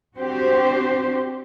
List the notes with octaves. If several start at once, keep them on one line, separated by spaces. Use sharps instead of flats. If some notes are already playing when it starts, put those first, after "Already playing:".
C4 D4 F#4 G4 C5